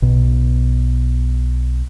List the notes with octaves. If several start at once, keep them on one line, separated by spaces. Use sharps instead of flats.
B1 B2